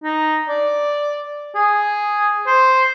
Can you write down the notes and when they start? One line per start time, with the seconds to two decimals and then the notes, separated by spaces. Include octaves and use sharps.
0.03 D#4
0.48 D5
1.55 G#4
2.46 C5